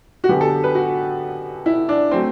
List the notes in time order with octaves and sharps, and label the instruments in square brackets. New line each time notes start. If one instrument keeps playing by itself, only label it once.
[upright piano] F#4
F#2 D3 F#3 B3 G4
A4
B4
F#4
E4
D4
F#3 A3 C4